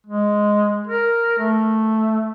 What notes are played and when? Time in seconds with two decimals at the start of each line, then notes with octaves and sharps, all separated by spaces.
0.07 G#3
0.87 A#4
1.39 A3